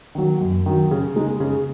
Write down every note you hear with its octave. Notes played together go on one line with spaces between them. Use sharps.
D#3 F#3
F#2
D#3 F#3
C#3
G#3 D#4
C#3